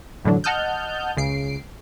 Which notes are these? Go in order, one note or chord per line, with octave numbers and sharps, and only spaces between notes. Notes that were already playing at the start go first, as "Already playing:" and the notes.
F#2 A2 D3 E3 F#3 D4
D#5 F#5 A5 D#6 F6 G6
C#2 C#3 C7 D7